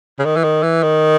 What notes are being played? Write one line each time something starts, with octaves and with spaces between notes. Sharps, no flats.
C#3
D#3
E3
D#3
E3
D#3